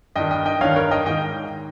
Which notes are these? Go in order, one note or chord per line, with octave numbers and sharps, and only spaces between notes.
G2 D#3 D#5 G5
D#5 G5
D#5 G5
G2 D#3 C#5 F5
A#4 C#5
D#5 G5
G#2 D#3 D#5 G5